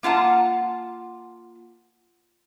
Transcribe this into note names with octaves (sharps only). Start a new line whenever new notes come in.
A#3 F4 F#5 A5